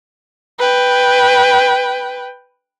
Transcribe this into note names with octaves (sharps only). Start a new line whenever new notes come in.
B4 G5